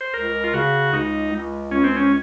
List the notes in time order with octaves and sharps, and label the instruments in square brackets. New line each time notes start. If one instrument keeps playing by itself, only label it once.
[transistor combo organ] C5
[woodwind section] C#2 [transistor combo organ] A#4
[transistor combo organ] F4
[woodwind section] C#3 [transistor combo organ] F#4
[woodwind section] C#2 [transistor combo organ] D#4
[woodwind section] C#2
[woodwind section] C#2 [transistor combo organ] C#4
[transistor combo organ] C4
C#4